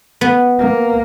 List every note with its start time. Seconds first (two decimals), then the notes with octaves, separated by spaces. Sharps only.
0.21 B3
0.60 A#3